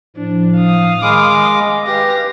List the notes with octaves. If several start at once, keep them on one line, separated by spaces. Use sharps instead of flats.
A2 F3 D4
F5 D#6
D#3 G#3 B5 D6 F6
D#5
G4 B4 F5 A#6